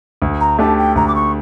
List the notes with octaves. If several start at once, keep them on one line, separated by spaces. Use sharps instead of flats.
D2
A#5
D3 A3 D4 G4 A5
G5
D2 A#5
D6
C#6